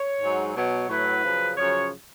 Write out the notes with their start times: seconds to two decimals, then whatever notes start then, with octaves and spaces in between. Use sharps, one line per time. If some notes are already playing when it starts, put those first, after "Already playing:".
Already playing: C#5
0.21 G#2 F#3
0.55 B2 F#3 C#5
0.89 A2 F#3 B4
1.24 F#2 C#3 F3
1.57 F#2 C#3 F3 C#5